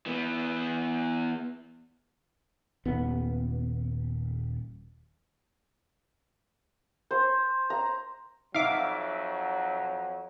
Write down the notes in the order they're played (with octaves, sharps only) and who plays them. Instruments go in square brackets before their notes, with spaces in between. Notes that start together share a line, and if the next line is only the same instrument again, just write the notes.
[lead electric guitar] E3 B3
[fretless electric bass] D#1 B3
[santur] C5
A#5
[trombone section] F2 F#3 [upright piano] D#4 E5 [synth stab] F5 D6